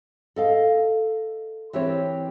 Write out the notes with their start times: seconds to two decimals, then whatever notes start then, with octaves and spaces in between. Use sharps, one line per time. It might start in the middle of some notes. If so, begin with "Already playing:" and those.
0.36 A4 D#5 F5
1.73 E3 C4 G4 A#4 C#5